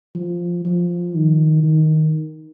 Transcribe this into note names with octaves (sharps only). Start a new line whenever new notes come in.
F3
F3
D#3
D#3